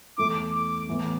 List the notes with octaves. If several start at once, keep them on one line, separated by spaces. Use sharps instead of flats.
E2 E3 A3 E4 D6
D6
A2 E3 B3